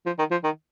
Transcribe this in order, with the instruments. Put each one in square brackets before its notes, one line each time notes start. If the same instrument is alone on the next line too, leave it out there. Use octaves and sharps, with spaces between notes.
[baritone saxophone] F3
D#3
F3
D#3